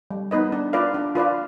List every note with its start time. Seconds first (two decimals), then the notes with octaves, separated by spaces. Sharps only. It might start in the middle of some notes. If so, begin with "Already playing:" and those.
0.11 G3
0.31 B3 D#4 B4 D#5
0.52 D4
0.73 F4 B4 D5 F5
0.94 D4
1.15 F4 B4 D5 F5